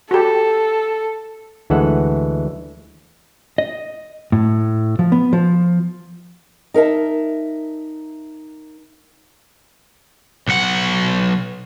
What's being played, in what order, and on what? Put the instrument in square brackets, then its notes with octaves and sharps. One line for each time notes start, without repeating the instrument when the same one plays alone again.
[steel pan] F#4 G4 [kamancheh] A4
[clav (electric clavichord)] D2 E3 G#3 A4 F#5
[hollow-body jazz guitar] D#5
A2
F3
B3
F3
[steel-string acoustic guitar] D#4 A#4 E5 A5
[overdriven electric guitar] B1 F#5